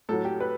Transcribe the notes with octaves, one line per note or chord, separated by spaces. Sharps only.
A2 F#3 A4
G4
B4